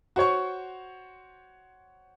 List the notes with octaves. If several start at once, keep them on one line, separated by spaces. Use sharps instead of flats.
F#4 C5 C#5 C#6